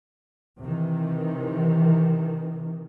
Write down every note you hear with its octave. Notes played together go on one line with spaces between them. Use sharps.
C3 D#3 E3